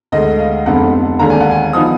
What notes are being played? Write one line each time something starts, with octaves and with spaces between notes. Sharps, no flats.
D2 D3 G#3 D#5
F5
F1 F2 D3 G#3 B3 F#5
D#2 D3 G#3 D4 A#5
G#5
F#5
G#5
F3 B3 D#4 D#6